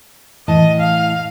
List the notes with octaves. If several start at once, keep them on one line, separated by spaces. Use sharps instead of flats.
A2 E3 D#5 A5
F5